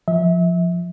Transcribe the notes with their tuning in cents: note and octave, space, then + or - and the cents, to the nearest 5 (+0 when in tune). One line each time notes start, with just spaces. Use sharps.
F3 +0 E5 -30